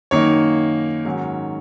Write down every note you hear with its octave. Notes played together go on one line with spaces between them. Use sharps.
F#2 D#3 A#3 D#4 C#5
G#2 D#3 F#3 C#4